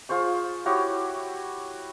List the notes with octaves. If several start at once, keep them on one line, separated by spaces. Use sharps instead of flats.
F4 G#4 C5 C#6
E4 F#4 G4 C#5